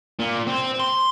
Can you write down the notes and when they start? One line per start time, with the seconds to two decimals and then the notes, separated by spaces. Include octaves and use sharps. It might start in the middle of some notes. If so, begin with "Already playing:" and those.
0.19 A#2
0.47 C4
0.80 C6